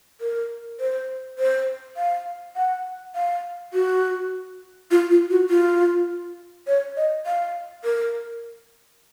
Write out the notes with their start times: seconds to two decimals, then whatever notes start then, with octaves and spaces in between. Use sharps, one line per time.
0.21 A#4
0.80 C5
1.39 C5
1.97 F5
2.56 F#5
3.15 F5
3.74 F#4
4.91 F4
5.11 F4
5.31 F#4
5.50 F4
6.67 C#5
6.97 D#5
7.26 F5
7.84 A#4